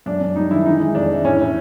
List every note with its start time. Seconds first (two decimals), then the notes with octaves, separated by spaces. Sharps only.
0.06 F#2 D4
0.21 F#2
0.36 G3 D#4
0.50 D#3 E4
0.65 E3 D#4
0.80 G#3
0.95 F2 D4
1.10 E3
1.24 A2 C#4
1.39 A2